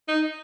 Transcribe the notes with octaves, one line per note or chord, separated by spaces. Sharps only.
D#4